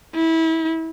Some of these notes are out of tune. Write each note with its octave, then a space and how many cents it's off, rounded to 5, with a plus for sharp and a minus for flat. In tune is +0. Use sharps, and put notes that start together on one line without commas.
E4 -25